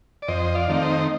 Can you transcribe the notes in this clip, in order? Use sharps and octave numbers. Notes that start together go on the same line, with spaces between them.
D5
F2 C5 D#5
D5 F5
D#3 A3 C4 D#4
C5 D#5